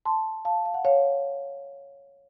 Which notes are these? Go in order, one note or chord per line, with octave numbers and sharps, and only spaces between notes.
A5 C6
F5 A5
F5
F#5
C#5 F5